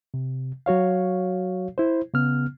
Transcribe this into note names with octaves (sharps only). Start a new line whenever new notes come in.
C3
F#3 F#4 C#5 F5
E4 C5
C#3 B3 F6